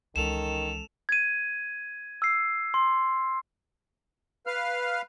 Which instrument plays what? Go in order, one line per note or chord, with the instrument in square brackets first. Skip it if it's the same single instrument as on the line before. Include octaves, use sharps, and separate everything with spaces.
[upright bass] C#2 E3 [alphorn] D#3 [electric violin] C#4 A4 [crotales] E7 F7
[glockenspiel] G#6 D#7
E6 C7
C6
[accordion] B4 F5 F6